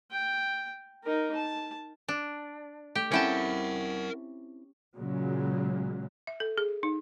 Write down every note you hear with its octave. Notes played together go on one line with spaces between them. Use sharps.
G5
D#4 A#4
A5
D4
A3 G4
C4 C#4 E4 A#4 F#5 G5 A5
A#2 C#3 F#3 G#3
E5
A4
G#4
D#4